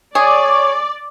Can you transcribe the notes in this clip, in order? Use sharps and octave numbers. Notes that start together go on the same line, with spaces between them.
G#4 C#5 D5